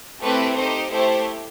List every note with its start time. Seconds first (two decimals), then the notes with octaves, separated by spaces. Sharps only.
0.21 A3 C4 E4 G4 B4
0.55 D#4 G4 C5
0.90 A3 E4 G4 C5